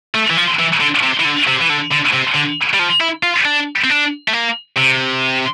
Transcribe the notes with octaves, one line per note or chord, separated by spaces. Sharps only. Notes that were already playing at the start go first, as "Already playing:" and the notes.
A3
E3
F3
E3
D3
C3
E3
D3
C3
E3
D3
D3
C3
D3
G3
F3
E4
F4
D4
C4
D4
A3
A#3
C3